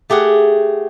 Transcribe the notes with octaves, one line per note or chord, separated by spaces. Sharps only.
A3 G4 G#4 F#5